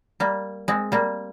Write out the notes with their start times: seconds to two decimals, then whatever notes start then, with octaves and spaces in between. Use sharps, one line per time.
0.20 G3 A#3
0.68 G#3 C4
0.92 G3 A#3